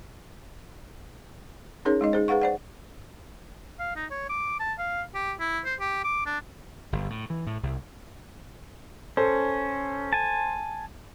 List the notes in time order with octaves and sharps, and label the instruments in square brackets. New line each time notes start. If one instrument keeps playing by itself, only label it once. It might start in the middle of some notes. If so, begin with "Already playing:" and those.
[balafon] C#4 D#4 G#4 A#4 C#5
G#3 D#4 D#5
D#4 G#4 C5
G#4 B4 F5 F#5 C#6
C5 D5 F#5
[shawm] F5
D#4
C#5
D6
A5
F5
G4
E4
C5
G4
D6
D4
[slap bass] G1
A2
E3
A2
C2
[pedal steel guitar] C#4 [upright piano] A4 C5
[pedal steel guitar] G#5 A5